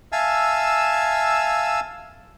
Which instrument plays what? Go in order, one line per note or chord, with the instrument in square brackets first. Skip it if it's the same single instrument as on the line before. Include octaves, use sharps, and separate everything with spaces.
[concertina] E5 F5 G#5 A5 E6